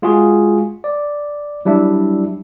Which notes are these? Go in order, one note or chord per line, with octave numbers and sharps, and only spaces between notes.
G#3 F4 F#4 G#4
D5
F#3 G3 D4 E4 E5